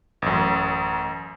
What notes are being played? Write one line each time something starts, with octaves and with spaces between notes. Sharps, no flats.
A1 F#2